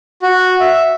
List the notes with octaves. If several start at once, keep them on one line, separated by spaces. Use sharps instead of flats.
F#4
E5